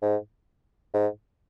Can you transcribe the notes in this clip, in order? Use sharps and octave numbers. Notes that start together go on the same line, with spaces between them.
G#2
G#2